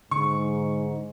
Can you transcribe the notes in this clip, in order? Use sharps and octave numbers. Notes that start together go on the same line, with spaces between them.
G#2 D3 C#6